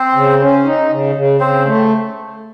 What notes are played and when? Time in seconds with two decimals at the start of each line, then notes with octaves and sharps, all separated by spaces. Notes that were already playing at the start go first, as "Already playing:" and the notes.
Already playing: C4 C5
0.15 C#3
0.40 C#4
0.65 D#4
0.89 C#3
1.15 C#3
1.40 C#3 C4 C5
1.65 A3